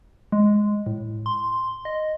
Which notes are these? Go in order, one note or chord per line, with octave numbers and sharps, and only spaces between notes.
G#3
A2
C6
D#5